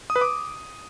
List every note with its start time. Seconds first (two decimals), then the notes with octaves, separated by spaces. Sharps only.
0.10 D#6
0.16 B4
0.21 D6